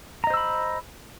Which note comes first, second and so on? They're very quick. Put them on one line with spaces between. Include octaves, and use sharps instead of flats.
A#5 D#5 C5 E6 B5